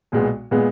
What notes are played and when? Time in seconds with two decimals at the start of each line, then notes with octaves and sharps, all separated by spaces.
0.12 B1 A#2 G#3 B3
0.51 A#2 G#3 B3